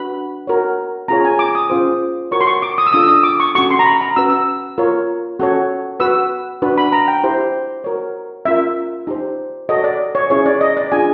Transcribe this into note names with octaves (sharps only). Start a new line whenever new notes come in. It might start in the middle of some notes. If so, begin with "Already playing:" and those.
Already playing: D4 F#4 B4 B5
F#4 A#4 C#5
C#4 F4 G#4 C#5 A#5
G#5
D6
D#6
C#4 F4 G#4 C5
F#4 A#4 C#5 C#6
C6
C#6
D6
D#6
E6
D4 F4 A4 D#6
E6
D#6
D6
C#6
C#4 F#4 A4 C#6
C6
A#5
B5
A#5
C#4 F#4 B4 E6
E6
F4 A#4 C#5
C#4 F#4 A4 C#5
F#4 B4 E6
D4 F#4 B4
B5
A#5
G5
E4 G4 C5
F#4 A#4 C#5
C#4 F4 A#4 E5
D#4 G4 C5
F#4 A4 C#5 D#5
D5
C#5
C#4 E4 G#4 C#5
D5
D#5
D5
D4 F4 G#4 G#5